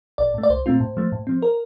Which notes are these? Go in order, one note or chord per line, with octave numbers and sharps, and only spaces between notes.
A#1 D5
A2 A3
D5
C2 C5
A#2 A3 C4 F4
A2
F3 A3
A2
F3 C4
A#4